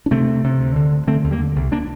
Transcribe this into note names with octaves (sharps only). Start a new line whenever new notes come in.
D4
C3 A3 C4
C3
C3
D2
D3
D2
D3 A3 C4
D#2
G3 A#3
D3
C2
A#3 D4